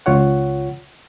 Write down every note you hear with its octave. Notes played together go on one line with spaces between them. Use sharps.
C#2 F4 C#5 F#5